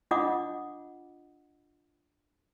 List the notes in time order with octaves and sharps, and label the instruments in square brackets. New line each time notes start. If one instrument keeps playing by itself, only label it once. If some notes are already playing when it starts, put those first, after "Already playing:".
[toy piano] D4 F4 D#5 F#5 D6 D#6